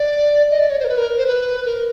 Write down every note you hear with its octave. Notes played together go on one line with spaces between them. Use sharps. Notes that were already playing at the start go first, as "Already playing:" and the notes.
Already playing: D5
D#5
D5
C#5
C5
A#4
B4
A#4
C5
B4
A#4